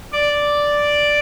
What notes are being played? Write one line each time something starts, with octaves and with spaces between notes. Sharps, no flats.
D5